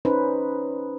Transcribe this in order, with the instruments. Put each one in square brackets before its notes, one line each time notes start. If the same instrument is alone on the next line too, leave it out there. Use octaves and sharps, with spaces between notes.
[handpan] C#4 D#4 B4 C5